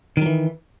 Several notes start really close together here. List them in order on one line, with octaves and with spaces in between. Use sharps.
D#3 F#3 E3